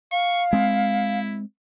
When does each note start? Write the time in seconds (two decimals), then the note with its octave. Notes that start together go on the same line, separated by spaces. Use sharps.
0.12 F5 C#6
0.53 G#3 C4 E4